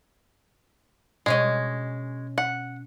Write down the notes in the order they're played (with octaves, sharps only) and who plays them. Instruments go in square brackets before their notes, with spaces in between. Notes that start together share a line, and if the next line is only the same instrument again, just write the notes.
[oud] B2 C#4 D#5 [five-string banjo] G#3
[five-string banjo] F#5